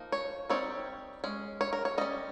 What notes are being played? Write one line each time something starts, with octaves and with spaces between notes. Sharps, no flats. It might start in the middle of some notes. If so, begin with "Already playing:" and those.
Already playing: F3 A#3 D#4
C#5
G3 C4 D#4 C#5
G#3 C#4
C#5
A#4
C#5
G3 C#4 D#5